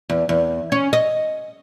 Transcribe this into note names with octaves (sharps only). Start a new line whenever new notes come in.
E2
E2
C#4
D#5